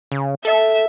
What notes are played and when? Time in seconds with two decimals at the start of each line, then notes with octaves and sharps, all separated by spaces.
0.12 C#3
0.45 A4 E5